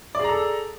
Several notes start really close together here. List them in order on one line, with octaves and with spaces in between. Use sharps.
D5 G#4 A#5 A4